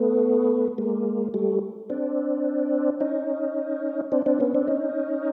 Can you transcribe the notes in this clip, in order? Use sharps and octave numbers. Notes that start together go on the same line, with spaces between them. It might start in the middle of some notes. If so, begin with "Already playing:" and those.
Already playing: A3 B3
G#3 A#3
G3 A3
C4 D4
C#4 D#4
C4 D4
C4 D4
B3 C#4
C4 D4
C#4 D#4